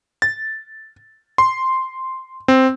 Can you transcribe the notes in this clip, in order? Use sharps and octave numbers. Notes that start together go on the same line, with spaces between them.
A6
C6
C4